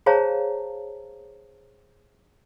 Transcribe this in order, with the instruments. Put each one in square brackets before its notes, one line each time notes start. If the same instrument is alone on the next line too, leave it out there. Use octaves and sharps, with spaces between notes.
[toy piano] G#4 C5 C#5 F5 A5 A#5